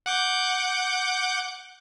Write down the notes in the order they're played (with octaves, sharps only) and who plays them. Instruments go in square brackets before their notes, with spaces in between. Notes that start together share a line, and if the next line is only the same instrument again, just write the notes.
[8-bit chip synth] F#5 D6 G6